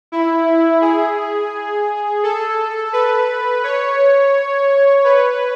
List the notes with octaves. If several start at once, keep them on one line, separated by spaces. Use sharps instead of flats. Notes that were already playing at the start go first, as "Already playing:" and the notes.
E4
G#4
A4
B4
C#5
B4